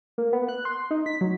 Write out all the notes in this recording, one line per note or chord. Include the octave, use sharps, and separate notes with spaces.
A#3
B3
F#6
C6
D#4
B6
F#3